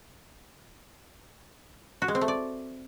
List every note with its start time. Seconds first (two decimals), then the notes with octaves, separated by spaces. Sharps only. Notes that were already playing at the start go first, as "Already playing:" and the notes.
2.02 F#4
2.08 G#3
2.15 C4
2.21 A3
2.28 D5